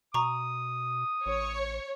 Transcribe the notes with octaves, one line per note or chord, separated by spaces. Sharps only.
B2 A#5 C#6 D#6
A1 C#5